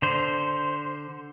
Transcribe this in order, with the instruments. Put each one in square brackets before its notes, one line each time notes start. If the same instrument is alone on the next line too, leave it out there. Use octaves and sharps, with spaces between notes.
[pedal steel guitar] D3 C5